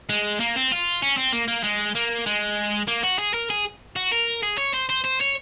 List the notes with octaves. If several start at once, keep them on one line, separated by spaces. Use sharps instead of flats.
G#3
A#3
C4
F4
C#4
C4
A#3
A#3
G#3
A#3
G#3
A#3
F#4
G#4
A#4
G#4
F#4
A#4
G#4
C#5
C5
C5
C5
C#5